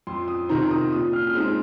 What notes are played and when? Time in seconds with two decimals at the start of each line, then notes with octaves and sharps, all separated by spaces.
0.07 F2 C6
0.28 D#6
0.49 C3 D#3 C4 D#4 A#5
0.71 D#6
0.92 A#2 D#6
1.13 F6
1.27 F6
1.35 G#3 C4 D#4 D#6